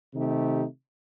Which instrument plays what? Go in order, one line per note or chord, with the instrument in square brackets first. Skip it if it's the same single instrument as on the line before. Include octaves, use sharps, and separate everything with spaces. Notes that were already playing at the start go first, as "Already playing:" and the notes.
[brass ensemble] C3 D#3 A3 D#4 G4